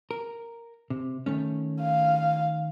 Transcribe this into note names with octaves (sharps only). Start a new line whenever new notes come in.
A#4
C3
D#3 A3 C#4
F5